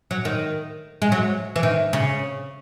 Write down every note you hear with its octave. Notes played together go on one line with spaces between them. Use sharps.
F#3
D#3
G#3
F#3
E3
D#3
C#3